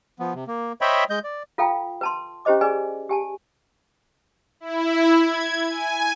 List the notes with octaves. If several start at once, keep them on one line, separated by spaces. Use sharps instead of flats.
F3 B3
C3
A#3
C5 C#5 D#5 E5 G5 B5
G#3 D#5 G6
D5
F4 A4 F5 G5 A#5
B4 A5 C6
C#4 E4 G4 C5 D#5 D6
G#4 B4 D5 G#5
G4 G#5 A5
E4
G#6
G#5